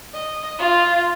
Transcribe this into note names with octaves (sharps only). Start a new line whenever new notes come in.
D#5
F4